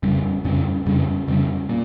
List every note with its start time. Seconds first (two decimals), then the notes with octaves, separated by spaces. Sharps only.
0.03 F2 C#3 G3 C#4
0.45 F2 C#3 G3 C#4
0.86 F2 C#3 G3 C#4
1.28 F2 C#3 G3 C#4
1.69 A#2